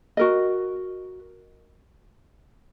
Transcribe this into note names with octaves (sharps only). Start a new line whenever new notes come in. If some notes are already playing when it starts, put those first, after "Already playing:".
F#4 A#4 D#5